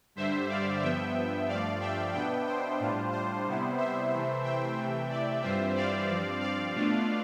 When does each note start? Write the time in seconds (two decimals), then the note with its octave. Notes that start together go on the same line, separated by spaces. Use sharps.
0.15 G2 D3 G3 C5 E5
0.49 D5 F5
0.82 G2 F3 B3 E5 G5
1.48 G2 F3 A3 D5 F5
1.80 E5 G5
2.13 B2 B3 D4 E5 G5
2.46 C5
2.80 A2 G3 D4 F4
3.12 C5
3.46 C3 G3 B3 E4
3.77 C5 E5
4.11 C3 E3 A3 E4
4.43 E5 G5
4.77 C3 E3 A3
5.10 D5
5.42 G2 E3 G3 C4 F4 C5 E5
5.75 D5 F5
6.08 G2 F3 C4
6.41 D5 F5
6.74 B2 A3 D4 F4